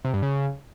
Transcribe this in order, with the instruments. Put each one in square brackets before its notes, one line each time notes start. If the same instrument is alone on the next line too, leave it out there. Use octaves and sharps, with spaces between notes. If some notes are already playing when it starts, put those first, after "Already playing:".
[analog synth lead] C3
G2
C#3